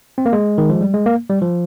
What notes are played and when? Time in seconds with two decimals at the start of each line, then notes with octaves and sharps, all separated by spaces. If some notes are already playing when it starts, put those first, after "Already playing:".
0.18 C4
0.26 A#3
0.33 G#3
0.58 D#3
0.70 F3
0.81 G3
0.94 G#3
1.06 A#3
1.30 G3
1.42 F3